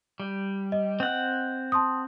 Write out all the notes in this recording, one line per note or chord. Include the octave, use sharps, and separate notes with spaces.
G3
D#5
C4 F#5
A5 C6 D#6